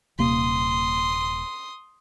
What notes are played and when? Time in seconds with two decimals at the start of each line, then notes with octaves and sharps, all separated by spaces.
0.18 D#1 C3 A#3 C6 D#6